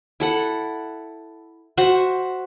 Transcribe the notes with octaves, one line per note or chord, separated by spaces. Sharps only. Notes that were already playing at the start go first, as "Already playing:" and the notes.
E4 A4 F#5
F#4 C5 E5 F#5